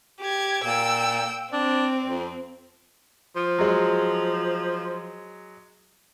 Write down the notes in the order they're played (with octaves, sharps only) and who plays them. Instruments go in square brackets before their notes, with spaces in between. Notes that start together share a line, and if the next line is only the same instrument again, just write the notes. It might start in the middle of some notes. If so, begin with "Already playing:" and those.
[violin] G4 G#6
[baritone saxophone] A#2 [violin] G5 E6
[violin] C4 [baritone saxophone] D4
[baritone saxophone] F2
[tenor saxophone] F3
[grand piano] F#3 G#3